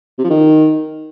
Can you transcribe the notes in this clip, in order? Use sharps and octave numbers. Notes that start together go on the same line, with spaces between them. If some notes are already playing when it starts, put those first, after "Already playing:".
C3
F3
D#3